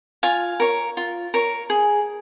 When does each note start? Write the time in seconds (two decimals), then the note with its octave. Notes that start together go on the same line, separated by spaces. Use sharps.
0.23 F4 F5 G#5
0.60 A#4 C#5
0.97 F4
1.34 A#4 C#5
1.70 G#4